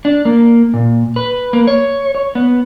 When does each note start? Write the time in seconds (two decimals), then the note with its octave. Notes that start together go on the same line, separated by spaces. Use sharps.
0.05 D4
0.25 A#3
0.74 A#2
1.16 B4
1.53 A#3
1.67 C#5
2.15 C#5
2.35 B3